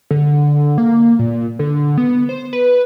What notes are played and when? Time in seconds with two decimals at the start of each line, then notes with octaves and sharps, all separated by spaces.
0.11 D3
0.78 A#3
1.19 A#2
1.59 D3
1.98 B3
2.29 C5
2.53 B4